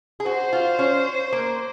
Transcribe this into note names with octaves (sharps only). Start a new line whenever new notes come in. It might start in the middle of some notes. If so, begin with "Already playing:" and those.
G#4
F#4 C5
F4
C#4
A#3